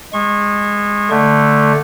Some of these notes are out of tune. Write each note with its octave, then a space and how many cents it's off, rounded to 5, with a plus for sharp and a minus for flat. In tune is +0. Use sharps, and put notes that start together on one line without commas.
G#3 -15 C#6 -35
D3 +0 A3 +0